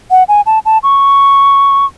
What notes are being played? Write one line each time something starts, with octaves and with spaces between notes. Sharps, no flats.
F#5
G#5
A5
A5
C#6